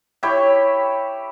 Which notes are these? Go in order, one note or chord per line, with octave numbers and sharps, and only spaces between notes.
E4 G4 C#5 E5